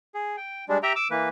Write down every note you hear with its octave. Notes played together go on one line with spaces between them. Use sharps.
G#4
G5
G3 G#3 D4
G4 E5 G5 A#5
D6 E6
E3 A#3 B4